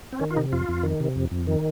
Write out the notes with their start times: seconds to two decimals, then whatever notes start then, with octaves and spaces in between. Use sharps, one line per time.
0.13 C4
0.20 D#3 C#4
0.31 F4
0.36 C3 D#4
0.52 F2 F4
0.69 F2
0.83 D#3
1.00 C3
1.16 F2
1.31 F2
1.47 D#3